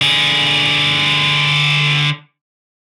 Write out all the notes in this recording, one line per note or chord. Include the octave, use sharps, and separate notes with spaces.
D3 G#4